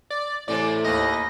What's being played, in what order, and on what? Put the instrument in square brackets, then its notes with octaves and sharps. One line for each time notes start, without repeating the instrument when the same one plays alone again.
[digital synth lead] D5
[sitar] E2 C3 E3 [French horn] A2 [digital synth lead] D5
[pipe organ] D#2 A#6 [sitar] D#4 B4 [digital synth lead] D#5